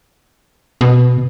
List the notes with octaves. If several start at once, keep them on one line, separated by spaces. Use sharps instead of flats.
B2